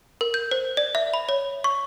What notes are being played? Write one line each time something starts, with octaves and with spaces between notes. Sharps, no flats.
A#4
G6
C5
D5
E5
B5
C#5
C#6